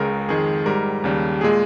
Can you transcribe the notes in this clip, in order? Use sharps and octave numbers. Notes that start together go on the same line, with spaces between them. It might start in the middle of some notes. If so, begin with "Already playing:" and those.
Already playing: C#2 C#3 G#3 A#4
F2 D#3 G#3 G#4
G#2 G3 A#4
D#2 C#3 G3
A#2 G#3 G#4